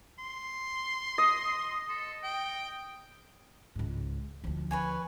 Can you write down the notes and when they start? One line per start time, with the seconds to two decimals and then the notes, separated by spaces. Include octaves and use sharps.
0.19 C6
1.18 D#5
1.89 A4
2.23 G5
3.76 C#2 G#2
4.44 D2 F3
4.71 B4 C#5 G#5